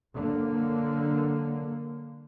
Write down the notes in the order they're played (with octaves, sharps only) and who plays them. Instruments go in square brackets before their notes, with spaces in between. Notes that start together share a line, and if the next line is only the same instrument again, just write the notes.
[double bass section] D3 F#3 A#3